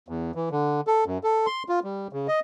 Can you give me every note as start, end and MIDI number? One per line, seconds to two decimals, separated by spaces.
0.09 0.31 40
0.35 0.49 52
0.51 0.81 50
0.87 1.04 69
1.06 1.18 42
1.23 1.46 69
1.46 1.63 84
1.69 1.79 65
1.84 2.07 55
2.13 2.27 49
2.28 2.40 75